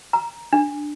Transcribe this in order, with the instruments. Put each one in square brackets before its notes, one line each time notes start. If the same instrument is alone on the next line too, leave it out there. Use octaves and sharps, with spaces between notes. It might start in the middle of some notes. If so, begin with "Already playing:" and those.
[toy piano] A#5
D4